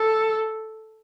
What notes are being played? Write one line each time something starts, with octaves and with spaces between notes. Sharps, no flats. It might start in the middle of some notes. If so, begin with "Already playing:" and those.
Already playing: A4